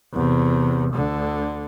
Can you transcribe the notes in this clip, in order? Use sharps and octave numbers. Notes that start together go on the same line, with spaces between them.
E2 C3
D2 D3